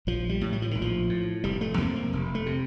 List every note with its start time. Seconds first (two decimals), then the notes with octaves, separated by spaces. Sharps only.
0.07 A#1 F3
0.29 G3
0.41 A2
0.53 G3
0.62 F3
0.71 A#1 D#3
0.82 F3
1.09 A2
1.44 F1 G3
1.61 A3
1.78 F2 C3 A#3
1.96 A#3
2.13 F1
2.35 A3
2.46 C3